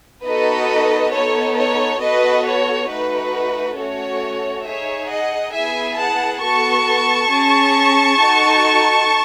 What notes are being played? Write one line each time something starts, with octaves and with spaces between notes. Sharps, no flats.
B3 D#4 F#4 A4 B4 D#5
B3 D#4 A4 C#5
C#5
B3 F#4 A4 B4 D#5
C#5
A3 D#4 F#4 B4
A3 C#4 F#4 A4 C#5
D#4 G#4 C#5 E5
D#5 F#5
B3 E4 G#4 E5 G#5
F#5 A5
B3 F#4 A4 A5 C#6
C#4 G#4
D#4 F#4 A4